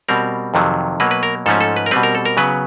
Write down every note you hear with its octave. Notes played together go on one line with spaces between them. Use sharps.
B2 G3 C4 A#4
F2 C3 D#3 F#3
B2 F#3 A#3 B4
B4
A#4
G#2 F3 A3 C#4 A4
A4
B4
A#4
B2 G3 C4 B4
A#4
A4
A#4
C#3 F#3 B3 B4